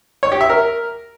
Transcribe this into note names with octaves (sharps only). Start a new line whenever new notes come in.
C#5
G4
E5
A#4